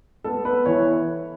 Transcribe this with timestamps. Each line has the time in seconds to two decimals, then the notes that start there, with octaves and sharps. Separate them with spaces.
0.24 B3 A4
0.45 B3 B4
0.66 E3 C#5